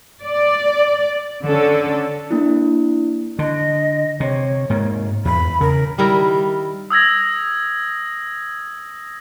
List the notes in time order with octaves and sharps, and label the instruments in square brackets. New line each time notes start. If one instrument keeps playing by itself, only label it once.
[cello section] D5
D3 C#4 A4
[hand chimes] A#3 D4 E4
[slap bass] D3 [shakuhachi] D#5
[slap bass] C3 [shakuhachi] C#5
[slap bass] G#2 A#3
[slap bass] E2 [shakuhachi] B5
[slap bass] C#3 [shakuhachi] A#4
[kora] D#3 G3 E4 A#4
[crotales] D#6 E6 G#6 A#6